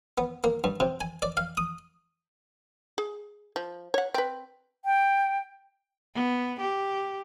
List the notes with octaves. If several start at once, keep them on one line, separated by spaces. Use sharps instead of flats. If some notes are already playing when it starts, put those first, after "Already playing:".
B3
A#3
G2
C3
G#5
D5
F5
D#6
G#4
F3
C#5 F#5
C4 B4
G5
B3
G4